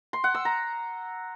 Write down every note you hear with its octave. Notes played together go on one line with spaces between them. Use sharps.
C6
F#5
E6
A#5